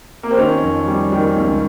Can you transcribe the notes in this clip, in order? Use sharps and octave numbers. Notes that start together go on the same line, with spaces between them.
A#3
C4
D#3 C#4
F2
G3
D#3
C#2 C#4